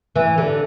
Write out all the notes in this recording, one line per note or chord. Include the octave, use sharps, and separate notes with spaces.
E3
D3